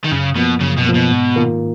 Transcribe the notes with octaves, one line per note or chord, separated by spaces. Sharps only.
D#3
F#2 C#3
B2 F3 A#3
F#2 C#3
B2
F3 A#3
B2
G#2
D#3 A#3 F4 A#4